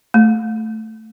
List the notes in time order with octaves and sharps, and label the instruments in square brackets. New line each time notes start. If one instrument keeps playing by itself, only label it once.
[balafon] A3